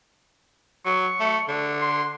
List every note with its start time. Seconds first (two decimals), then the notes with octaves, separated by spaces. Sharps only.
0.86 F#3 C#6
1.20 A3
1.49 D3
1.81 C6